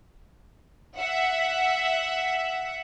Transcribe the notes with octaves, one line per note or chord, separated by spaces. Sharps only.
E5 F#5